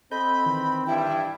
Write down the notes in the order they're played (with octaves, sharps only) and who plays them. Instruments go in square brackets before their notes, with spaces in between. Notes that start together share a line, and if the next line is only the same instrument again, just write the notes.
[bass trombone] C4 [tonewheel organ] A4 D#5 G6 [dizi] B5
[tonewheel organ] D#3 E3
[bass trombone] G2 [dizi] E4 [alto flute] G5